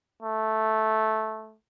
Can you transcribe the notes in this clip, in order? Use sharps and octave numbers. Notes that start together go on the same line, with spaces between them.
A3